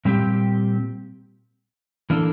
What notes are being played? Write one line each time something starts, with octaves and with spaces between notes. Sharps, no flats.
A#2 G3 C4 G4
E3 A#3 D4 A4